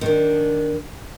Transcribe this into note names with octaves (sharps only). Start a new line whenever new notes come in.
D#3 D4